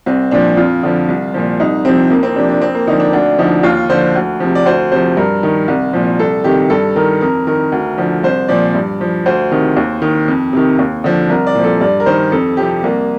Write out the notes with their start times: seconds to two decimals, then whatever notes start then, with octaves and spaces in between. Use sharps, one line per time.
0.06 C2 C4
0.31 A#2 F3 D4
0.57 F2 F4
0.83 D3 F3
1.09 C2
1.34 A#2 F3
1.60 C2 D#4
1.85 C3 F3 C4
2.10 F2 A#3
2.23 C4
2.36 C3 F3 D4
2.49 D4
2.61 F2 C4
2.75 A#3
2.87 D3 F3 D#4
3.00 D4
3.13 D2 D4
3.39 D3 F3 D#4
3.63 D#2 F4
3.90 D3 F3 C5
4.15 D2
4.40 C3 F3
4.55 D5
4.66 D2 C5
4.92 C3 F3 C5
5.17 G2 A#4
5.43 D#3
5.68 C2
5.93 A#2 F3
6.19 C2 A4
6.44 C3 D#3 G4
6.70 G2 A4
6.96 D#3 A#4
7.21 F2 A#4
7.47 D#3 A#4
7.72 D2
7.98 D3 F3
8.24 C2 C5
8.48 A#2 F3 D5
8.75 G2
9.01 F3
9.26 D2 C5
9.51 C3 D#3
9.77 D#2
10.02 D#3
10.28 F2
10.53 C3 D#3
10.79 D#2
11.04 D3 F3
11.29 C2 A#4
11.47 D5
11.55 A#2 F3
11.64 A4
11.81 G2 D5
12.00 A#4
12.06 D#3 C5
12.32 F2 A4
12.57 C3 F3 G4
12.84 C2 A#3